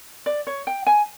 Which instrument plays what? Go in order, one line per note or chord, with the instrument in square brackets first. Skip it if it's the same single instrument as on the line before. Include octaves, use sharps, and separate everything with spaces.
[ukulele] D5
C#5
G5
G#5